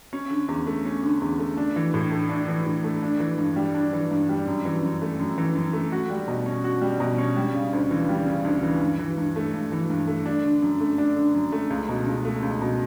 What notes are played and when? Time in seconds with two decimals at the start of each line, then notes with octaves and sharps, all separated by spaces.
0.13 C#4
0.30 D3
0.48 E2
0.67 A3
0.85 C#4
1.03 D3
1.21 E2
1.39 A3
1.57 D4
1.76 E3
1.94 A2
2.12 A3
2.29 D4
2.48 E3
2.66 A2
2.84 A3
3.03 D4
3.20 E3
3.38 G2
3.56 G3
3.75 D4
3.93 E3
4.11 G2
4.29 G3
4.47 F#2
4.65 E3
4.83 F#2
5.02 A3
5.19 F#2
5.38 E3
5.55 F#2
5.73 A3
5.92 F#4
6.10 G3
6.28 B2
6.46 C#4
6.64 F#4
6.81 G3
7.00 B2
7.18 C#4
7.37 G3
7.54 C#3
7.73 D2
7.91 E3
8.09 G3
8.27 C#3
8.45 D2
8.63 E3
8.81 G2
8.99 E3
9.17 G2
9.36 A3
9.54 G2
9.72 E3
9.90 G2
10.07 A3
10.26 D4
10.44 D3
10.62 F#2
10.80 A3
10.98 D4
11.17 D3
11.34 F#2
11.52 A3
11.70 C#2
11.89 B2
12.06 C#2
12.25 A3
12.43 C#2
12.61 B2